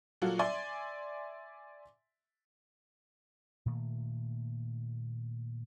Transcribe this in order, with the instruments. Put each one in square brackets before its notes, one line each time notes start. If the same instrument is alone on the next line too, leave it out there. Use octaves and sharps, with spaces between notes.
[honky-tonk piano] A#2 F#3 F4 F#4 A4
D5 E5 G#5 C6
[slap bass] A#2 D#3 A3 A#3